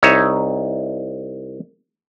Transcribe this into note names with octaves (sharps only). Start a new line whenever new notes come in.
C2 D#4 C#5 E5